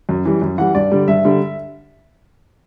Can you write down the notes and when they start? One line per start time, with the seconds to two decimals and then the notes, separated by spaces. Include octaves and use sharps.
0.09 F#2
0.25 E3 G3
0.41 F#2
0.58 E3 G3 F#5
0.75 G2 D5
0.92 D3 G3
1.08 G2 E5
1.25 D3 G3